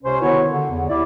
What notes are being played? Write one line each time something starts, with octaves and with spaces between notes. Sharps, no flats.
C#2 C3 C#4 C5
D3 D#3 B3 E4 F#4 C#5
D3
E2
D#2 E4 D5